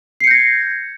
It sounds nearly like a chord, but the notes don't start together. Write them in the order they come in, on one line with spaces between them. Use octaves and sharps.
C7 C#7 G6 A#6 G#6